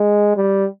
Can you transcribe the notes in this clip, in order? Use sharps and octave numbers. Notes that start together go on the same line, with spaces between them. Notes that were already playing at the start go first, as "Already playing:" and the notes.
Already playing: G#3
G3